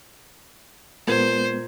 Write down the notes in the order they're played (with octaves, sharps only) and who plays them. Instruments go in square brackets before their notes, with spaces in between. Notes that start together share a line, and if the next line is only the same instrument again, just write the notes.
[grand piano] A#2 A#4 G#6 [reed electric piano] G#3 B3 [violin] C5